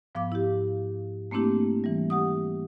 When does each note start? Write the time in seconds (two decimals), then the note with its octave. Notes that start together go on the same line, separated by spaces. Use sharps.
0.15 G#2 F3 B3 F5 D6
0.32 E4 G4
1.31 A3 A#3 C4 D4 E4 G4
1.84 E3 G3
2.10 G4 F#5 D#6